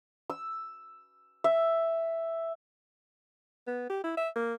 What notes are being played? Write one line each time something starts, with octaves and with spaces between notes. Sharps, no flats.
E6
E5
B3
G4
E4
E5
A#3